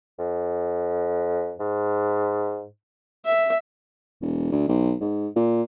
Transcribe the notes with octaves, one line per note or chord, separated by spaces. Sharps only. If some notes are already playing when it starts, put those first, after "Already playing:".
F2
G#2
E5
E1
D2
B1
G#2
A#2